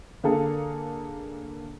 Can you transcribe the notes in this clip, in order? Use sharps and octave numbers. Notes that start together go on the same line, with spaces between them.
D3 A#3 G#4 A4